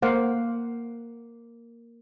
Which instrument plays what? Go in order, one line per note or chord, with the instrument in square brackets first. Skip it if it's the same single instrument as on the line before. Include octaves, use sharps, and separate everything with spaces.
[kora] A#3 [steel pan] C5 F5 F#5